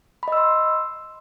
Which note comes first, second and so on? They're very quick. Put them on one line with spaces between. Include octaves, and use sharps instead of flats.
B5 D#5 E6 C6